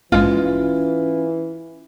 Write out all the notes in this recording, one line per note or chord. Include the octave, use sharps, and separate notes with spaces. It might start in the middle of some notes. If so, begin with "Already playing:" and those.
A#1 G#2 E3 G#3 C#4 F4